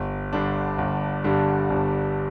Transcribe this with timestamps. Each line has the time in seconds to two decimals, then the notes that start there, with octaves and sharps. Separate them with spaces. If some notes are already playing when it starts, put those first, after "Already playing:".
Already playing: G1
0.33 G2 D3 G3 D4
0.78 G1
1.24 G2 D3 G3 D4
1.70 G1